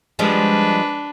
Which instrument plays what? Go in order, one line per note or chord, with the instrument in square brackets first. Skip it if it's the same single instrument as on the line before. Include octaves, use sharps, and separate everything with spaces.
[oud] F3 G3 G#3 [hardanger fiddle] D4 B4